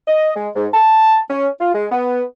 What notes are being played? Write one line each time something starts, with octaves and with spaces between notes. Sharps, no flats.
D#5
G#3
G#2
A5
C#4
F4
G#3
B3